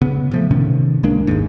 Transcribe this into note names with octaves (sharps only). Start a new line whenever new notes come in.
C#3 B3
A#2 F3 A3
A2 C3 D#3 C#4
C#2 G#3 A#3 D4
G#1 D#2 G#2